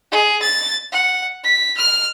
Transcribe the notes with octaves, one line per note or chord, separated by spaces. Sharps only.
G#4
A6
F#5
B6
F6